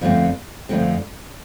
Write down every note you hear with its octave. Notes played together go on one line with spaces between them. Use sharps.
F2 D3 F3 A3 C4
F2 D3 F3 A3 C4